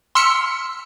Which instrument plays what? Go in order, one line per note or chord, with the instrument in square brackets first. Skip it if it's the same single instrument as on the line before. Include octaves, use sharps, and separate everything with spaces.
[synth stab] C6 E6 F6 B6 C#7